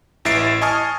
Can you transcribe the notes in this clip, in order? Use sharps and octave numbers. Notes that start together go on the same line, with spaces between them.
A1 E3 E5 A6 C7 D7
D#5 G#5 A5 C#6 D#6 F6